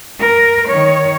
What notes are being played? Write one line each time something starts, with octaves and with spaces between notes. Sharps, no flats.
A#4
D#3 C#5